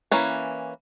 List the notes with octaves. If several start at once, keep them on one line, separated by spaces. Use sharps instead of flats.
E3 A#3 C#4 B4